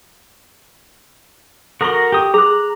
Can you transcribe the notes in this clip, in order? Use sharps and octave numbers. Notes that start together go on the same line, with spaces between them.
F#4 A4 A#4 A#5 C#6
G4 D#6
G#4 A#5 F#6